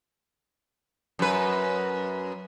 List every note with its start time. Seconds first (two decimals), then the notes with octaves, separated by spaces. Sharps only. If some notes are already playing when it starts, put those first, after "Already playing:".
1.19 F#2 B4